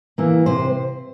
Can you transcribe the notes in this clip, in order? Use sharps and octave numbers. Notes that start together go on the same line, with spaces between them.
E3 A#3 E4
C3 C5